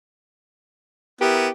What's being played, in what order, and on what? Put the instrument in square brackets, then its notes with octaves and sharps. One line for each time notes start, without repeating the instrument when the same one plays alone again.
[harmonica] B3 E4 A#4 [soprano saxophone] G4